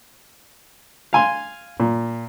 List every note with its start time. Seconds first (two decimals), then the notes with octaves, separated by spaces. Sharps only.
1.13 F5 G#5 C6
1.80 A#2